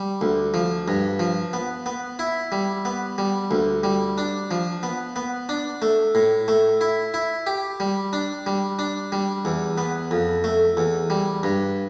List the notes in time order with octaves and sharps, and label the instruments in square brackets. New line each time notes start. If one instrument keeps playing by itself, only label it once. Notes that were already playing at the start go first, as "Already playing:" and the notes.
Already playing: [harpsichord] G3
D2
F3
G2
F3
B3
B3
E4
G3
B3
G3
D2
G3
D4
F3
B3
B3
D4
A3
A2
A3
E4
E4
G4
G3
D4
G3
D4
G3
E2
B3
F2
A3
E2
G3
G2